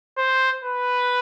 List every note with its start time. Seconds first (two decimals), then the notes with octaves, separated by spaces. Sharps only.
0.18 C5
0.64 B4